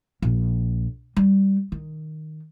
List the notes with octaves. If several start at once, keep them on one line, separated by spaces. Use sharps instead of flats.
A#1
G3
D#3